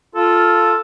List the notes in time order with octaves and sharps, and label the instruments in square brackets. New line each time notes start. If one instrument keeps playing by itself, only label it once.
[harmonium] F4 [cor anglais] A4